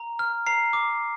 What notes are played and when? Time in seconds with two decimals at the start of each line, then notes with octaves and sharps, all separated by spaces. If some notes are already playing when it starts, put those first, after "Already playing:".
Already playing: A#5
0.19 F6
0.47 A#5 C7
0.73 D6